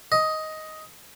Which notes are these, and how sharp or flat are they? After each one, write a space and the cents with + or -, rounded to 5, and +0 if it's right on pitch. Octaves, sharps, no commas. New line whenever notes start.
D#5 +10